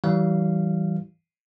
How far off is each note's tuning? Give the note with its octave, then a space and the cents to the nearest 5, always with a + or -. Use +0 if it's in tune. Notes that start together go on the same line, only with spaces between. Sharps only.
E3 -15 G3 -40 F5 -15